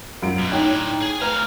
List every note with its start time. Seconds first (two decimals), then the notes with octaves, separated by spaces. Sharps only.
0.22 F#2 F4 D7
0.39 G2 B2
0.52 A2 D4 D#4 C#5 G5
1.02 G#4 G#5
1.21 A3 B4 F5 A#5